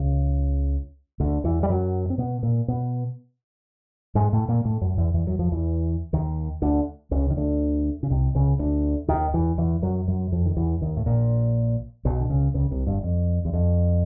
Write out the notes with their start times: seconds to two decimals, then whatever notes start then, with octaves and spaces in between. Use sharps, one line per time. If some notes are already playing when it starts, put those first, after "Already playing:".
Already playing: C#2 C#3
1.20 D2 D3
1.44 E2 E3
1.63 G3
1.69 F#2 F#3
2.10 C4
2.18 B2 B3
2.43 A#2 A#3
2.68 B2 B3
4.15 G#2 G#3
4.33 A2 A3
4.48 A#2 A#3
4.65 A2 A3
4.81 F#2 F#3
4.98 E2 E3
5.14 E2 E3
5.26 F#2 F#3
5.39 F2 F3
5.52 E2 E3
6.13 D#2 D#3
6.62 D2 D3
7.11 C#2 C#3
7.30 D#3
7.37 D2 D3
8.03 C#3
8.10 C2 C3
8.35 C#2 C#3
8.59 D2 D3
9.08 D#2 D#3
9.33 E2 E3
9.58 E2 E3
9.82 F#2 F#3
10.08 F#2 F#3
10.32 F2 F3
10.46 D#3
10.56 E2 E3
10.81 D#2 D#3
10.97 A2
11.06 A#1 A#2
12.05 B1 B2
12.20 D3
12.30 C#2 C#3
12.54 C#2 C#3
12.71 C2 C3
12.87 G1 G2
13.03 F2
13.45 E2
13.53 F2